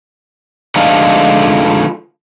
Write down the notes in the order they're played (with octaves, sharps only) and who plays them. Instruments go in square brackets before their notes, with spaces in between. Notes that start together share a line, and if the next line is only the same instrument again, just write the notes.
[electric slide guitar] D3 F3 G#3 A3 D#4 F4